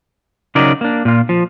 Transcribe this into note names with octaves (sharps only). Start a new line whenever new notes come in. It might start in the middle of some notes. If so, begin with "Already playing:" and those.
C#3 F#3 D#4 A#4 D5
A#3 D4
A#2 F4
F3